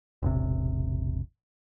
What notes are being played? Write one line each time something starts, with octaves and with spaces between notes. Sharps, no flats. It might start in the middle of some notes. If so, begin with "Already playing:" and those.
E1 A1 C3